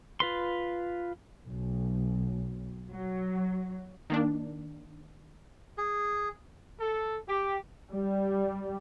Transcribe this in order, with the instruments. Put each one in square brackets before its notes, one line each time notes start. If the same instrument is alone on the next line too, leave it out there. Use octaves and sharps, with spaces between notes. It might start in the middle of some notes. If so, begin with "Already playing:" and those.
[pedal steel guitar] F4 B4 C6
[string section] B1
F#3
[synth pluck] D#3 A#3 D4
[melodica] G#4
[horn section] A4
G4
[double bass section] G3